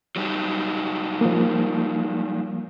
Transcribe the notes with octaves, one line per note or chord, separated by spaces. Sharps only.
F#3 G3 D#4
F3 A#3